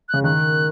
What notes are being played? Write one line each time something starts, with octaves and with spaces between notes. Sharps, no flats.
C#3 F#6
D#3 F#6